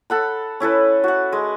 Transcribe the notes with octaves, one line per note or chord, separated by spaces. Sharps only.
A4 F#5 B5
C#4 E4 A4 B4
F#4 F#5
G#3